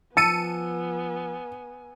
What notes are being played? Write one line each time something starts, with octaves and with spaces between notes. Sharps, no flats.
F3 B3 G#5 A5 E6 C#7 D#7